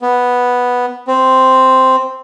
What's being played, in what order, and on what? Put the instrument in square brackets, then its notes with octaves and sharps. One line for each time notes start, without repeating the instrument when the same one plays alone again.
[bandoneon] B3
C4